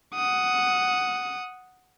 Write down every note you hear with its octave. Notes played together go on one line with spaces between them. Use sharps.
F#5 D#6